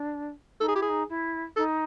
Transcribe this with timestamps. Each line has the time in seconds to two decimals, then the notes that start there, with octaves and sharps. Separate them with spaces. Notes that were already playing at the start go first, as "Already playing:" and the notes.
Already playing: D4
0.60 D#4 A4
0.68 G#4
0.74 E4 G4
0.82 G#4
0.89 D#4
1.09 E4
1.56 D#4 A4